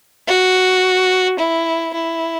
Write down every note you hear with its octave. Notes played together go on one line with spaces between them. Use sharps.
F#4
E4
E4